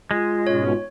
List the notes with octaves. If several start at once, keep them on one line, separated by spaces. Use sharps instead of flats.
G#3 F4
G#2 B2 C#4 C#5